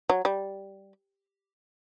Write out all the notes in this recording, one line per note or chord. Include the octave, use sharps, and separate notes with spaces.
F#3
G3